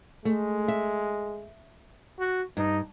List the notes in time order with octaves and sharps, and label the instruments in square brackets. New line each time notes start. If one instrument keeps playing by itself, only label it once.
[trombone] G#3 [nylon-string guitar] A3
[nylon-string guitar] E5
[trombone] F#4
[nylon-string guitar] G2 [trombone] D#4